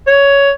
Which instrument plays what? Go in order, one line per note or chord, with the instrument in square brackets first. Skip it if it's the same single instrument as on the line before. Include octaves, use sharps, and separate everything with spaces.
[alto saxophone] C#5